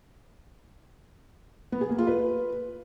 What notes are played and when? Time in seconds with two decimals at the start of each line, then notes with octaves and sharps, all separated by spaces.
1.72 B3
1.81 G#4
1.90 A#3
1.98 F4
2.07 B4